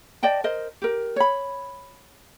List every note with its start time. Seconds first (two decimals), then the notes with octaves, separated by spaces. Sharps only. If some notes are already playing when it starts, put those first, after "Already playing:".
0.23 D5 D#5 G5 A5
0.44 A#4 C5 D#5
0.82 G4 A#4
1.16 C#5 B5